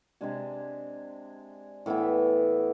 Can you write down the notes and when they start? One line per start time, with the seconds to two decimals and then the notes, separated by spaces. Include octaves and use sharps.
0.21 C3 G#3 D4 G#4
1.86 A2 E3 B3 E4